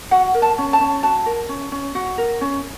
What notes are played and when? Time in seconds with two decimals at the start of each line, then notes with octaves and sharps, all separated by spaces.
0.11 F#4 F#5
0.34 A#4
0.42 A5
0.58 C#4
0.73 A5
0.80 C#4
1.03 F#4 A5
1.26 A#4
1.49 C#4
1.72 C#4
1.95 F#4 F#5
2.18 A#4
2.41 C#4